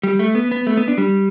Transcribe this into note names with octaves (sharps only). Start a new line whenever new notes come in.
G3
A3
B3
B3
A3
B3
D4
G3